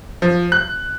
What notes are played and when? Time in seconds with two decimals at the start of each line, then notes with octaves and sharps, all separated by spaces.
0.22 F3
0.52 F#6